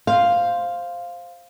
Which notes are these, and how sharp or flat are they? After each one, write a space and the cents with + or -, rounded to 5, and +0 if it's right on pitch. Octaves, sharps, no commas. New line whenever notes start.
C5 +0 F5 +0